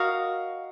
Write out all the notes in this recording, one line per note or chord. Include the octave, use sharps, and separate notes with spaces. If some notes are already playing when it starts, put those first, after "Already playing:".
Already playing: F#4 A#4 D#5 F5